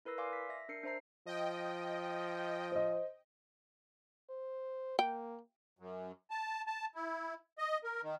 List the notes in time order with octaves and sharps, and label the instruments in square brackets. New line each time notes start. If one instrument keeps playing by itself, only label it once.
[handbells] E4 A#4 B4 E6 A#6
D5 F5 G#5 C6 D6
B6
E5 A#6
D4 A#4 C7 C#7
D4 C5 E5 A#5 C7
[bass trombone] F3 [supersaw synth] D#5 G5
[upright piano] C5 D#5
[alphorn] C5
[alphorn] A#3 [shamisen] G5
[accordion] F#2
A5
A5
E4
D#5
A#4
D#3